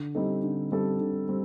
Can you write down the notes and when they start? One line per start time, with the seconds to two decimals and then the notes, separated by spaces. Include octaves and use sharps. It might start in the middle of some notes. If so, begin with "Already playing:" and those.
Already playing: D3
0.15 G3 C4 D#4 A4
0.44 D3
0.72 G3 C4 D#4 A4
1.00 D3
1.29 G3 C4